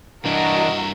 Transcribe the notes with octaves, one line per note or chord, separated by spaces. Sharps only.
G2 E3 D4 E4 F#4 A#4 D#5